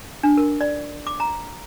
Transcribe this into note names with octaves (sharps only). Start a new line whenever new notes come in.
D4
A#4
D5
D6
A#5